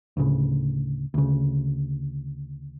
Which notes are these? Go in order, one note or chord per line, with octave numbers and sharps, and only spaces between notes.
D2 A2 C#3
D2 C#3